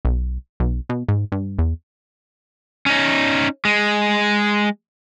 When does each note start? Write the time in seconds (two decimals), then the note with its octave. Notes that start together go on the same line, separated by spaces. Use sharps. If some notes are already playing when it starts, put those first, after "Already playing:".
0.05 B1
0.60 B1
0.89 B2
1.08 G#2
1.32 G2
1.59 E2
2.86 C#4 D#4
3.65 G#3